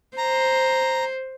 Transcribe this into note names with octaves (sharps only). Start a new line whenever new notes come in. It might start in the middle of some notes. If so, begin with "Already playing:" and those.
C5 A#5